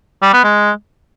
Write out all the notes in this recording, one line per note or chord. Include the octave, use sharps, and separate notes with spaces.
G3
B3
G#3